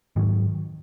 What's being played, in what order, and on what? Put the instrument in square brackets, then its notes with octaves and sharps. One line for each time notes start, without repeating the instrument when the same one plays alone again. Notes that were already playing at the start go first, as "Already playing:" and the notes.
[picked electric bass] G#2 D#3 F#3